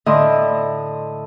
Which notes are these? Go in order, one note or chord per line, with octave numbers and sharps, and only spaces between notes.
A2 D3 D#5 C6